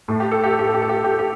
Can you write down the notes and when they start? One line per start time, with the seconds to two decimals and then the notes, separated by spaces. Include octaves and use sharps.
0.08 A2 A3
0.20 G4
0.31 A4
0.44 G4
0.51 A4
0.59 G4
0.67 A4
0.74 G4
0.82 A4
0.89 G4
0.96 A4
1.04 G4
1.12 A4
1.19 G4